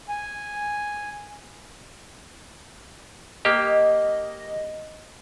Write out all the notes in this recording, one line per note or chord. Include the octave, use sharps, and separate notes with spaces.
G#5
A#3 G4 D#5